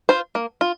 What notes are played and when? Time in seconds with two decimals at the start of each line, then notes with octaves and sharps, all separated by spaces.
0.09 F4 C5
0.35 A#3
0.61 F4